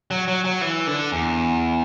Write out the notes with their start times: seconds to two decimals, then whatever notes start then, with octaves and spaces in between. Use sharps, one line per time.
0.11 F#3
0.28 F#3
0.44 F#3
0.61 E3
0.87 D3
1.12 E2